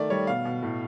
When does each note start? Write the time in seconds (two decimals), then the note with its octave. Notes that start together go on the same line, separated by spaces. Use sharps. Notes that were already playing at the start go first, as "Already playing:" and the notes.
Already playing: D#3 A3 D5
0.10 G3 C#5
0.27 B2 F5
0.45 B2
0.62 A2